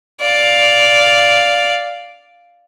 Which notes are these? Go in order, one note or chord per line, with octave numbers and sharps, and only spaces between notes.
D5 F5